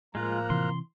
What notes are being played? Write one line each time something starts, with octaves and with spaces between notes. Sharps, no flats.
A2 F3 G#3 A#3 F4 A#5 F6 F#6
C3 E3 C6